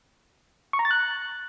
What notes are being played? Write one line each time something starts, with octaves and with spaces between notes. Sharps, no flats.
C#6
A#5
A6
F#6